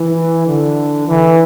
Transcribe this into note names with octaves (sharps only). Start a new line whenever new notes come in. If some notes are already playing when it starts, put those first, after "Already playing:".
Already playing: E3
D3
E3